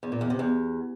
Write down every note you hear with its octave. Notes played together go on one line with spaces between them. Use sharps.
E2
A#2
E2
C3
E2